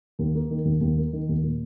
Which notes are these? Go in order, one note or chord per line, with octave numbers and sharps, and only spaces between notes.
D#2
A#3
D#3
D#2
D#2
A#3
D#3
D#2
A#2